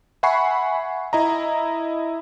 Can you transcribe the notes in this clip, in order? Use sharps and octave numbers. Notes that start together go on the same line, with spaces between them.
E5 F#5 G#5 B5 C#6 C7
E4 D#5 A#5